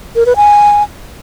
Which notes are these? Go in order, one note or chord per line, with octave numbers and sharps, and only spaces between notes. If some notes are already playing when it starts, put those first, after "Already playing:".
A#4
B4
G#5